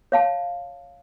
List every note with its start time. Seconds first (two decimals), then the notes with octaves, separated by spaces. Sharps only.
0.12 C#5 F5 A5